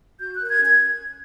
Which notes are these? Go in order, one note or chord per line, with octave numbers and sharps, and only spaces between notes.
F#4 G6
F#6
A#4 G6
G#6
C#4
G#6